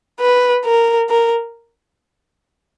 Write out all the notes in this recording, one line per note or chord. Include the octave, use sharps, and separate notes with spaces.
B4
A#4
A#4